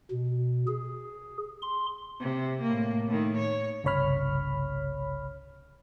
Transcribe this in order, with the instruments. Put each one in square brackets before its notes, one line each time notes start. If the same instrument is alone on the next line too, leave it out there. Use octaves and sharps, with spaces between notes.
[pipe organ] B2
G#4
C6
[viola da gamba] C3
A2 A#3
A2 D#3
C#5
[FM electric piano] G1 C2 C#3 C#5 B5 F6